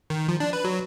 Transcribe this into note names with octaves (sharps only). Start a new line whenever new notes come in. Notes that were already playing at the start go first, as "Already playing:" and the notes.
D#3
F3
D4
B4
F#3